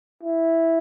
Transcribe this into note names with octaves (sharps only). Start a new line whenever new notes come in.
E4